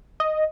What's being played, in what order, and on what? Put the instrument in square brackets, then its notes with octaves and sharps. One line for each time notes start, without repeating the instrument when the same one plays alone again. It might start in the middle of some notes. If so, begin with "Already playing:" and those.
[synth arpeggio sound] D#5